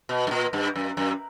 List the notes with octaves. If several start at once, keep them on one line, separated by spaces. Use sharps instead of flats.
B2
G2
A#2
G2
F#2
F#2